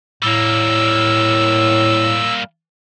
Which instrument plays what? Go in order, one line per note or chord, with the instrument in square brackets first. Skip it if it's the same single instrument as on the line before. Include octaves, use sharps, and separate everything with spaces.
[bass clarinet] A2 [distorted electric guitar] G3 A#3 [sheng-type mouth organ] E6